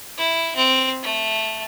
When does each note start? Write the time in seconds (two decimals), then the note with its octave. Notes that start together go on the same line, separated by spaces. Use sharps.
0.17 E4
0.56 C4
1.03 A3